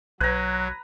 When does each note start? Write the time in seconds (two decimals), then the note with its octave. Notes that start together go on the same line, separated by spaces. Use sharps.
0.21 B1 F#3 B4 A#5 F#6 G#6